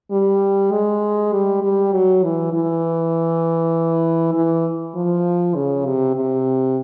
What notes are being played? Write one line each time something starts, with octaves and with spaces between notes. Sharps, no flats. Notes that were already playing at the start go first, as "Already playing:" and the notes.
G3
G#3
G3
G3
F#3
E3
E3
E3
F3
C#3
C3
C3